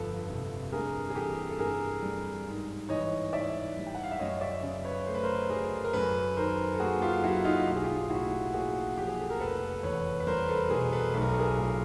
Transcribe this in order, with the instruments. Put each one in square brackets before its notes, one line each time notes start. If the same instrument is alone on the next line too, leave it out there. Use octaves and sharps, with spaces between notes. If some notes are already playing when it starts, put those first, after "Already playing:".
Already playing: [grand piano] G1 F2 F3 A4 B4
C3
G2 G#4 A#4
G#4
E3 G4 A4
A4
G2 G#4 A#4
G3
G#2
E3 C#5 D#5
G#2 D5 E5
G3
G5
F#5
F5
E5
F#2 C#5 D#5
D5 E5
C#3
B4 C#5
A3 C5
B4
A#4 C5
F#3 G#4 A#4
A#4
F#2 A4 B4
D#3 A#4 C5
A4
A#3 F#4 G#4
F4 G4
F#3 E4 F#4
D#4 F4
B1 G4
G#4
F4 G4
A2 E4 F#4
A#3 F#4 G#4
F3 G4
G#4
A4
A#4
F1 A4 B4
E2 B4 C#5
B4
G3 A#4 C5
A4 B4
B2 G#4 A#4
A4 B4
B1 B4
A#4
A4
G#4 A#4
A#2